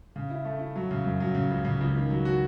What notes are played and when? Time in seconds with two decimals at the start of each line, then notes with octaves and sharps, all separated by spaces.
0.16 C#3
0.30 E4
0.45 A3
0.60 E4
0.76 F#3
0.91 C#3
1.05 F#2
1.20 F#3
1.35 C#3
1.51 C#2
1.65 C#3
1.81 C#2
1.95 D#3
2.10 F#3
2.25 F#4